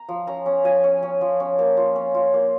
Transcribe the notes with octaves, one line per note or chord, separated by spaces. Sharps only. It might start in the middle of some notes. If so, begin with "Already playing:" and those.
Already playing: A#5
F3
C#4 A#5
C#4
F3 G#5
C#4
C#4
F3
C#4
A#3
F4
C#4
F4
A#3